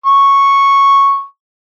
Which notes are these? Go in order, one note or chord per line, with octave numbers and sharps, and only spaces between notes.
C#6